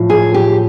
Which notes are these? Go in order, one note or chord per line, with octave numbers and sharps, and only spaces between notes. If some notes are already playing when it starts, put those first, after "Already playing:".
Already playing: A2 F3
G#4
G4